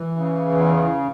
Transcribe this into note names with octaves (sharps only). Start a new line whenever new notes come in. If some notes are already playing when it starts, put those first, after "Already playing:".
Already playing: E3
C#3
E2